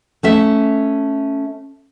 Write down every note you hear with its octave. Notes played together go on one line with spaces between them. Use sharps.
A3 C#4 E5